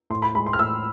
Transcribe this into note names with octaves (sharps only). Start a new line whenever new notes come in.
A2 C6
B5
G#3 B5
C6
F6
A2 E6